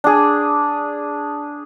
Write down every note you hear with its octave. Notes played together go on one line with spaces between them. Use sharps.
D4 G#4